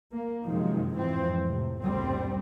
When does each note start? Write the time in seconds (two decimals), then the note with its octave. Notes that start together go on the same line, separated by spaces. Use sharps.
0.12 A#3
0.46 F#2 C3 D#3 F3 G#3
0.95 F2 G#2 E3 F3 C4
1.44 A2 C3
1.83 F#1 D2 A#2 G3 C4